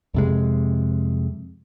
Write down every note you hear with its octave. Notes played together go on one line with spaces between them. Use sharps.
F2 C3 G#3